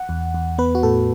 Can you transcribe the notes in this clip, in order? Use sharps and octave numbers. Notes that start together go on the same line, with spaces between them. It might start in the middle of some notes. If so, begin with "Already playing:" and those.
Already playing: F#5
E2
E2
B3 B4
F#4
A2 A4